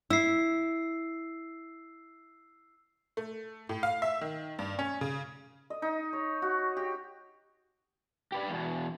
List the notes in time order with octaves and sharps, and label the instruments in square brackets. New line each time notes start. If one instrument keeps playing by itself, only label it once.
[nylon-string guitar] E4 [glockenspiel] E6 C7
[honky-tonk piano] A3
A2
F5
E5
D#3
G2
C#4
C#3
[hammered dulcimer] D#5
D#4
C#5
F#4
G4
[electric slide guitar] G4 B4 D5
E2 B2